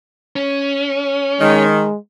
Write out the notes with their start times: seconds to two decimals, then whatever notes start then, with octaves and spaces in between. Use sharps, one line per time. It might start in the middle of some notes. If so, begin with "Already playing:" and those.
0.36 C#4
1.41 D#3 G#3